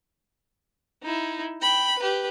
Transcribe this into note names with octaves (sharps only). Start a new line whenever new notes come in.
D#4 E4
G5 B5
G4 B4